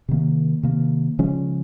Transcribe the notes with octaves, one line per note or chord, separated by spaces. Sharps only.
C3 D#3 A#3
C3 D#3 A#3
C#3 F3 G#3 C#4